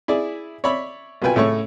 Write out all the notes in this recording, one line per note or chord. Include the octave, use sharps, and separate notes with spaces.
E4 G#4 D5
C#5 D5 E5 B5
C2 B2 F4 B4 G5 G#5
A2 C#3 A3 C#4 C#5 C#6